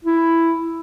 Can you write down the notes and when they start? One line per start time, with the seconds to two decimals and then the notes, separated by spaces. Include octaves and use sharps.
0.05 E4